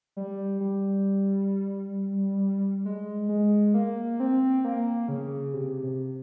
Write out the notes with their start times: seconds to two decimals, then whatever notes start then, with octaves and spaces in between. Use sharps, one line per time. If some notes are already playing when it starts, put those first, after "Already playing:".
0.17 G3
0.61 G3
2.85 G#3
3.29 G#3
3.74 A#3
4.20 C4
4.65 A#3
5.08 C#3
5.54 C3
5.83 C3